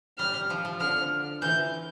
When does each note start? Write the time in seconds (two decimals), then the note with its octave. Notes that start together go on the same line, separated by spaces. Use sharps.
0.18 G3 F6
0.34 G3
0.50 F3
0.65 F3
0.80 D3 F6
1.42 E3 G6